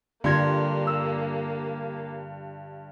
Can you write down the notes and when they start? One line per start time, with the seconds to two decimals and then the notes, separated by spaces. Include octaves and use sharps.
0.24 G2 D3 A#3 F4 C6 G#6 A#6
0.87 E6